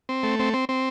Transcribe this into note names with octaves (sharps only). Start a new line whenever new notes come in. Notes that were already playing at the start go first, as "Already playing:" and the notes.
C4
A3
C4
C4
C4